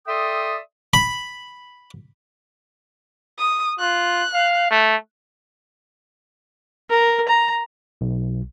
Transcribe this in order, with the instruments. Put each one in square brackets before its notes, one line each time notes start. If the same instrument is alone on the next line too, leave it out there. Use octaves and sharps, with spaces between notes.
[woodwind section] A4 D5 E5 G5 C6 D#6
[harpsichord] B5
[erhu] D#6
[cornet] F4 [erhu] F#6
[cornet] F5
A3
[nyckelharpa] A#4
A#5
[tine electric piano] B1